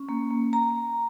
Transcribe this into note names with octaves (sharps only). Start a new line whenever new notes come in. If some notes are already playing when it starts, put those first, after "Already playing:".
Already playing: C#4
A#3
A#3
A#5